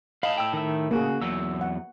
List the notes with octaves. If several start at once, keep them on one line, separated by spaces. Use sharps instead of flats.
A2 D#5 F5 A5 B5
G5 E6
D#3 E5
C#3 A#3 F#4 G#4
E2 F#3 E6
F#5